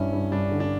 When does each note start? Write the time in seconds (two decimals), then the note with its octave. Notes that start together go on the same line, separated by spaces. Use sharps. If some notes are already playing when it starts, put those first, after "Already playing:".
Already playing: G2 C#4 E4
0.13 G2
0.31 G2 D4
0.51 D3
0.60 D4